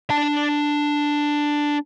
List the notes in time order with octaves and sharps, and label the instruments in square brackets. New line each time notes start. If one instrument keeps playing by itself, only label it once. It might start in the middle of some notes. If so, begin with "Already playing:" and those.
[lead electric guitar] D4 A5